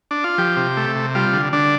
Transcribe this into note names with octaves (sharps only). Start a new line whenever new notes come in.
D4
F4
F3 G4
C3
A3
C3
G3 F4
D3
D3 D4